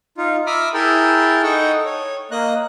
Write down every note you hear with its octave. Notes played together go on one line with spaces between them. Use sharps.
D#4 F4
E5 A#5 B5 D6 D#6 F6
E4 G#4 A#4 G5 A5
D#4 A4 D#5 F#5 G5 C#6
C#5
A#3 D#5 A#5 F#6